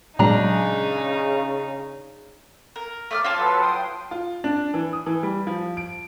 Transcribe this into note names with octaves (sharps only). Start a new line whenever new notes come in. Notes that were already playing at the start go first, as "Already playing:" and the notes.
A#2 C#3 F#3 G#3 D4 D#4 A#5
A#4
A3 D5 F6
F4 C#5 A5
F#3 A4 B4
G5 C6 D#6
F4
D4
E3
D#6
E3
G3
F3
D7